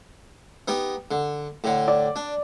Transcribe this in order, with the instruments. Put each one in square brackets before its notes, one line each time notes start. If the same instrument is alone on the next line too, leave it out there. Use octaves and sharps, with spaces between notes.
[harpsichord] B3 D#4 G4
D3
A2 D3
[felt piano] D5
[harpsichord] D4